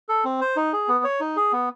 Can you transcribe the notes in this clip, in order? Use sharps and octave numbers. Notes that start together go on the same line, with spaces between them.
A4
C4
C5
D#4
G#4
B3
C#5
D#4
G#4
B3